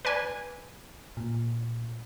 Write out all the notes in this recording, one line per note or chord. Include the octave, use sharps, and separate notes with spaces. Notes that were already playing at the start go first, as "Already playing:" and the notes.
B4 D5 G#5
A#2